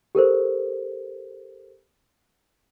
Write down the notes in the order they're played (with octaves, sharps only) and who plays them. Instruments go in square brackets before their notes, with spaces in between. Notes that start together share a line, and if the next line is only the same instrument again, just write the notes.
[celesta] G4 A4 A#4 C5